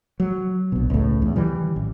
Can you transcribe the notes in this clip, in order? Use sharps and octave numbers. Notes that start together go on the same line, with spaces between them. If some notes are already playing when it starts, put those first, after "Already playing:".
F#3
A#1 B2
C#2 A2
E2
D#3 E3 G3
A1